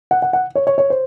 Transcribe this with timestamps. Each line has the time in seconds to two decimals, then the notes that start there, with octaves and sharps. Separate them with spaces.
0.11 F#5
0.22 F#5
0.33 F#5
0.55 C#5
0.67 C#5
0.78 C#5
0.90 C5